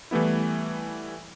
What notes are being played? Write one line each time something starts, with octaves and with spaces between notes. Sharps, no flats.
E3 G3 A3 B3 E4